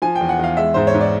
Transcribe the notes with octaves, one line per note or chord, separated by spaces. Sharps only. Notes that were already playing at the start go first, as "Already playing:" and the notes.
F3 G#5
G5
E2
F#5
E2 F5
G#3 E5
G#2 C5
C#5
G#2
D5